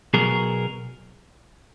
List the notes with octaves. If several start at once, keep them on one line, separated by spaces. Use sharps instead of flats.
B2 F#3 B3 G#4 A#4